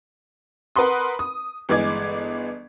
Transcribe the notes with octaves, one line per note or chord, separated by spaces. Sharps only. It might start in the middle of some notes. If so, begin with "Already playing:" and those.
A#4 B4 F#5 B5 C6 D#6
D#6
G1 E3 G#3 G#4 D6 G#6